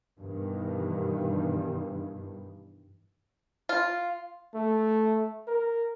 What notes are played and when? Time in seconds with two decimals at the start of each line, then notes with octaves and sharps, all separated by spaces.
0.19 G2 B2 D#3 E3
3.69 F4
4.54 A3
5.47 A#4